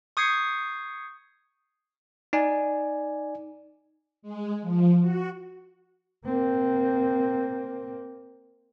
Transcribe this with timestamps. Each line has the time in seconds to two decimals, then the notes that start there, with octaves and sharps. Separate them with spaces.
0.17 C#6 D#6 G6 G#6 C7 C#7
2.33 D#4 D5 G#5
4.22 G#3
4.62 F3
5.01 F#4
6.25 A#3 C4